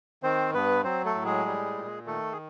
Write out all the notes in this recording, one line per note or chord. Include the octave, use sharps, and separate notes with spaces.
D#3 C4 C5
G2 B3 B4
F#3 C4 C5
A3 A4
A2
G#3 G#4
G3
A#2
D#3 A3 A4
G#4